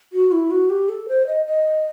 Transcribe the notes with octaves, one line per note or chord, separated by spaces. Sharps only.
F#4
E4
F#4
G4
A4
C5
D#5
D#5